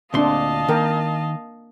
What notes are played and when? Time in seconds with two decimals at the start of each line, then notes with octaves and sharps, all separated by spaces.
0.14 D2 A#2 C4 D4 D#5 F5 A5 C6
0.68 D#3 A#3 A#4 G5